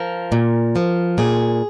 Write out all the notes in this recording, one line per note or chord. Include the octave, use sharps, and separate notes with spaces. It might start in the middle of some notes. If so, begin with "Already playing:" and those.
Already playing: F3 A#4
A#2
F3
A#2 G#4